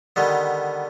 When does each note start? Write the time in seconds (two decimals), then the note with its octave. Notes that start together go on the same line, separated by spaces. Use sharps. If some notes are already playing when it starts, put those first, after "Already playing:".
0.16 D3 D#3 G3 B3